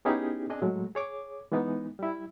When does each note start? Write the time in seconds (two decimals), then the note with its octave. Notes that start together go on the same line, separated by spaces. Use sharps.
0.05 B3 C#4 D#4 E4 G4 G#4
0.50 C4 D4 G#4 D#5
0.61 A2 F#3 G#3 A3
0.95 G#4 C#5 D6
1.52 E3 G#3 B3 D#4
1.99 G3 E4